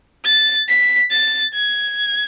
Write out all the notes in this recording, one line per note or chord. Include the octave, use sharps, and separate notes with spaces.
A6
B6
A6
G#6